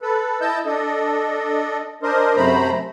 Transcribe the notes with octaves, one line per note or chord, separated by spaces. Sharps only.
A4 B4
E4 D#5 A5 E6 G6
D4 A4 D#5
D4 A#4 C5 D#5
F#2 C3 A3 C5 A#5 B5